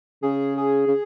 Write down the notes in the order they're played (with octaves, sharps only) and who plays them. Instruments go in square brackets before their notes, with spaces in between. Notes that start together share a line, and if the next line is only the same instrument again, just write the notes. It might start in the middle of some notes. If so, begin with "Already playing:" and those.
[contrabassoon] C#3 [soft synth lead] G#4
[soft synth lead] G#4
[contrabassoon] C#3